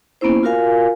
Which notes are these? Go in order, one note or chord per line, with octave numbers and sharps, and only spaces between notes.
A#3 B3 C#4 E4 C5
F4 F#4 A#4 F5 G#5